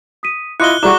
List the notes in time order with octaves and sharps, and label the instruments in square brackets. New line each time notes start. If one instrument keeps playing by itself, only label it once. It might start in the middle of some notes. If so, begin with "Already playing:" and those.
[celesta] D#6 B6 D#7
[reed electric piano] E4 F4 D#5 [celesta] C6 D6 C#7 [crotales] F#6 G7
[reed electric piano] G3 E4 [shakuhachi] F#4 [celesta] G#4 D5 A#5 [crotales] D6